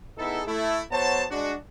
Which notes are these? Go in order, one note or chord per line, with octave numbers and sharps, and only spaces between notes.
B3 D#4 E4 G#4 A4
A3 E4
F#3 B3 C5 C#5 A5
G#3 D4 F#4